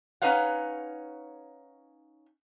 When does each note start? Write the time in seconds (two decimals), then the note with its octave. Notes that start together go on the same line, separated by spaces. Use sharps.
0.22 C#4 D#4 B4 C#5 F5 F#5